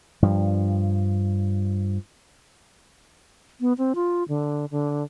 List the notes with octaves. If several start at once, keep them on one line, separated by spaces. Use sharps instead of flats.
G2 F3
B3
C4
F4
D3
D3